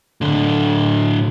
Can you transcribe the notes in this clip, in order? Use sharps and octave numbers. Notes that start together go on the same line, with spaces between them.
A2 D3